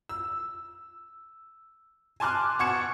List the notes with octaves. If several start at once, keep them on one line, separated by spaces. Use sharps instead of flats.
E6
G#5 A5 C6 D6 F6 F#6
B2 F#5 C#6 G#6 C#7 E7